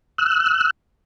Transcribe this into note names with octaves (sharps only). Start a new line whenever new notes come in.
E6 F#6